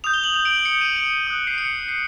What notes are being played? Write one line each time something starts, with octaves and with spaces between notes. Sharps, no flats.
D#6 G6 F7
G7
F#7
F7
D7
D7
C#7
D#7
D7
D#6 F#6
C7
C#7
C7